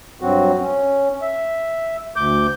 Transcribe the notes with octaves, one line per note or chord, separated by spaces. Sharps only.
G2 F#3 C4 F#4
C#4
E5
D2 D6 G6